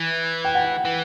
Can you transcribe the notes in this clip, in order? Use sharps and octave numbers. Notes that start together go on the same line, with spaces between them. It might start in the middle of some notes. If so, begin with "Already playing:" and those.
Already playing: E3
G5
F#5
G5
E3